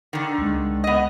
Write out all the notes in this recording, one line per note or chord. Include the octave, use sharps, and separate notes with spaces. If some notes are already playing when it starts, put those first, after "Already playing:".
D3 D#3
C#2 G#3
B3 D#5